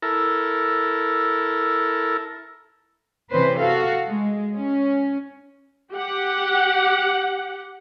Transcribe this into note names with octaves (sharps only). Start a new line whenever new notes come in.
E4 A4 A#4
C3 E3 C#4 B4 C5
F#4 A4 F5
G#3
C#4
G4 F#5